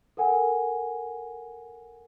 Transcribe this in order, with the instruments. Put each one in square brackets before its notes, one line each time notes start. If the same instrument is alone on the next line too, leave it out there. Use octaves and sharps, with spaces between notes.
[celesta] A4 A#4 F#5 G#5